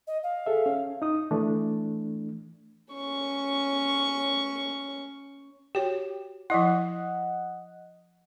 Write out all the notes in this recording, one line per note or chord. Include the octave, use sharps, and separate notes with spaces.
D#5
F5
G#4 A4 E5
C#4
D#4 D#6
E3 A3 D4
C#4 C#6
F#4 G4 C#5
F3 E4 D#5 F#5